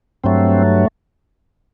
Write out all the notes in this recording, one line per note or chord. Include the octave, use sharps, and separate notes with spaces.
G2 F#3 A3 C4